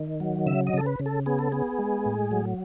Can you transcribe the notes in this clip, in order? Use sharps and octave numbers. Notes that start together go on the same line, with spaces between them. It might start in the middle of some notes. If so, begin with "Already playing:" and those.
Already playing: D#3
F#3
C#3 E5
D#5
C#3 A4
B4
C#3
A4
B3 G#4
A4
B3 G#4
G#3
A2
F#3